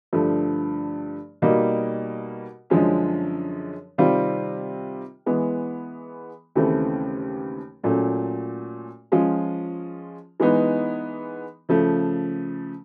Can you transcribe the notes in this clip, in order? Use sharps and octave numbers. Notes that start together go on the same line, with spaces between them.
G2 D3 F3 A3
B2 G3 A#3 D#4
F#2 D3 F3 G#3 C#4
C3 D#3 G3 C4 F4
E3 G#3 B3
D#2 C#3 E3 A3 C4
A#2 F#3 A3 C#4
F3 G#3 C#4 F4
E3 G#3 B3 D#4
C#3 F3 A3